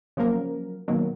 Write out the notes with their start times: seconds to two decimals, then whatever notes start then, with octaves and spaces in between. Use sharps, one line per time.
0.17 C#3 F3 F#3 A#3 A#4
0.88 B2 D#3 F#3 A#3